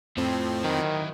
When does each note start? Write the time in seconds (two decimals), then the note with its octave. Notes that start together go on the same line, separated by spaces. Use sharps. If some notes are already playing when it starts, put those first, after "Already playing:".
0.17 F2 A2 F3 C4
0.65 D#3 F#3 E4